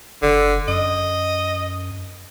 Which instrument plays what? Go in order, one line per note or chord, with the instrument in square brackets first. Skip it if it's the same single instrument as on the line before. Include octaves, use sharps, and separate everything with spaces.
[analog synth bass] F#1 [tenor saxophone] D3
[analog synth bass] F#2 [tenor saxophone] D#5